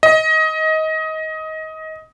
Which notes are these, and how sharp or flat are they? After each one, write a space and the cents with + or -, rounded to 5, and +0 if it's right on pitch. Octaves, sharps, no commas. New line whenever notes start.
D#5 +20